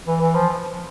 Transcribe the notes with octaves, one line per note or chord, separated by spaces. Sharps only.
E3
E3
F3